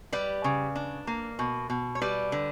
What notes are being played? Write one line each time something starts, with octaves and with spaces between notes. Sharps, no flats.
G3 B4 D5
C#3
D4
A#3
B2
B2
C#5
G3 B4 D5
D3